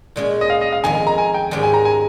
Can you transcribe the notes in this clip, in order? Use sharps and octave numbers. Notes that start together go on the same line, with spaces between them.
A#2 G#3 C#4
D#5
F5
D#5
F5
F2 D#3 G#3 G#5
G#5
A#5
G#5
G5
G#2 D#3 G#3 C#4 G4
G#5
A#5
G#5